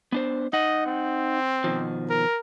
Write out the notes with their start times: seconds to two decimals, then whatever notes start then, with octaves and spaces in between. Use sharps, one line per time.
0.12 B3 D4 C5
0.53 D#4 D#5 F#5
0.86 C4
1.64 B2 D#3 F3
2.10 A#4